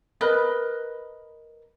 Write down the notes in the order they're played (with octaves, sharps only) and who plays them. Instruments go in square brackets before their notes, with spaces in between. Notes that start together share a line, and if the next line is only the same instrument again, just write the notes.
[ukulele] A#4 B4 D#5 B5